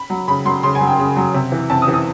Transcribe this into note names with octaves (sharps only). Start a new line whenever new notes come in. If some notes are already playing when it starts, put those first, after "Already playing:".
Already playing: B5
F#3
C#3 B5
F#3 C6
C#3 C6
G#5
F#3
G5
C#3
F#3
C3
E3
C3 A5
D#6
E3
D#6